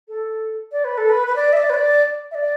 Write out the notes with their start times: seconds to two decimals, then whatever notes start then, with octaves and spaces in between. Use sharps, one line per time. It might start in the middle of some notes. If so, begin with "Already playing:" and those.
0.08 A4
0.72 D5
0.85 B4
0.98 A4
1.10 B4
1.27 B4
1.36 D5
1.53 E5
1.57 D5
1.70 B4
1.74 D5
2.31 E5
2.35 D5